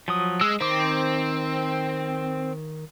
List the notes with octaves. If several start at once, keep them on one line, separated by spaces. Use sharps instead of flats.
F3 F#3 D#6
G#3 E6
D#3 C4 D6